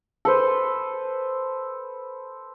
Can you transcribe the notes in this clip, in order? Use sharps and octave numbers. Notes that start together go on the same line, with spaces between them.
A4 B4 C5